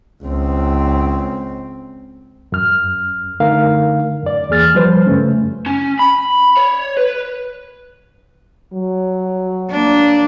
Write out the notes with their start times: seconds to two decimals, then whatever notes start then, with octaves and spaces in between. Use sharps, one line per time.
0.24 C#2 C4
2.52 F#2 F6
3.40 D3 A3 D#4 A#4 F5
4.22 F#2 D5
4.49 E2 A#3 G#4 F6 A6
4.75 F3 G3 B4 C5
5.06 F#2 C#3 A3 C#4
5.66 C#4
5.99 B5
6.57 C#5
6.97 B4
8.74 F#3
9.70 A#3 D4